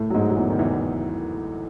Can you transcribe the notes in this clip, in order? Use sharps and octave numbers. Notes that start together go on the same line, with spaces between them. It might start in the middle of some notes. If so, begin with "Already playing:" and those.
Already playing: A2 A3
F#3
G#2 G#3
F#3
E2 E3
D#3
E2 E3